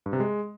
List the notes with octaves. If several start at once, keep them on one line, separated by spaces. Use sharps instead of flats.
G2
C3
G#3